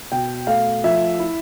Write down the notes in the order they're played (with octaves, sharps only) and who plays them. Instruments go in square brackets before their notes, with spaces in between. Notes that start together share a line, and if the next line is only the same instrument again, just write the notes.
[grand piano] B2 G5
A3 F5
F3 E5
E4